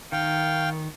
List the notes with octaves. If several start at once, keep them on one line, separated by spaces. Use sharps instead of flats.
D#3 F5 G5